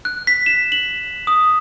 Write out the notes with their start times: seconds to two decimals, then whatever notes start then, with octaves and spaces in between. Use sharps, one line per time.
0.05 F#6
0.27 B6
0.46 E7
0.72 F#7
1.27 D#6